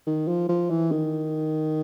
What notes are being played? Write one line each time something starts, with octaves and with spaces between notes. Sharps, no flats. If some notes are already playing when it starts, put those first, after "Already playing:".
D#3
F3
F3
E3
D#3